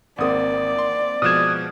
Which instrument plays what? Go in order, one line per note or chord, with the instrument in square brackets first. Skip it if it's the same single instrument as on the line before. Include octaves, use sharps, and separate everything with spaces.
[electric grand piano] G#1 D#6 [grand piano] A#3 C4 F#5 [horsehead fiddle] D5
[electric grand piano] C6
[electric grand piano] B2 F3 G#3 [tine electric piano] D#6 G#6 [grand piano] F6 F#6 E7